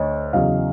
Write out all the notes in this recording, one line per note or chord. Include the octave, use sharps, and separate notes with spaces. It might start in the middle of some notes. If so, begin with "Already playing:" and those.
Already playing: D2 C#5 D#5
E2 C#3 F#3 D#5 F5